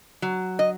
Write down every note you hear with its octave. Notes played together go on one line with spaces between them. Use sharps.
F#3
D#5